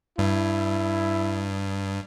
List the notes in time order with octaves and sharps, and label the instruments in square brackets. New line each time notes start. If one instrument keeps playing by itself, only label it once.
[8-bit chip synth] G2 [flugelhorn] E4